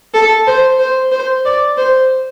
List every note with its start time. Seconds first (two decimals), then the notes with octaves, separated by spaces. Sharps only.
0.14 A4
0.47 C5
0.79 C5
1.12 C5
1.45 D5
1.78 C5